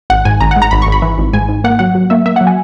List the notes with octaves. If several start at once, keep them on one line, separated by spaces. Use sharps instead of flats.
G#1 F#5
G#2 G#5
G#1 A#5
F#5
G#2
A#5
G#1 B5
C#6
G#1
B5
E3
G#1
G#2 G#5
G#2
A#3 F#5
F#3 F#5
F#3
A#3 E5
A#3 E5
F#5
F#3
G#5